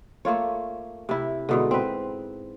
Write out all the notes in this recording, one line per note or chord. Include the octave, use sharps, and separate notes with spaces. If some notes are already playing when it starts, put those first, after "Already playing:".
A3 A#3 F4 C#5
C3 E4
G#2 B2 D3
C4 B4